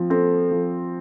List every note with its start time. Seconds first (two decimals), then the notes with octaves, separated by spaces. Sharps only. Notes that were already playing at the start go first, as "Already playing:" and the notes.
Already playing: F3 C4
0.10 C4 A4
0.51 F3